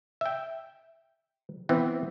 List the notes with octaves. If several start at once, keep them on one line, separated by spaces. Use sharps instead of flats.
E5 G5
E3 B3 C4